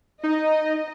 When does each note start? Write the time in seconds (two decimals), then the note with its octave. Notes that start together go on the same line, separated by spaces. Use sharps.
0.23 D#4 D#5